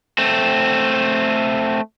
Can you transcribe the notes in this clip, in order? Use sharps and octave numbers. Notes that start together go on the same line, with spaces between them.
A3 C4